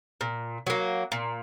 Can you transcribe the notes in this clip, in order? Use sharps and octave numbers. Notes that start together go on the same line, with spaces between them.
A#2
F#3 A#3
A#2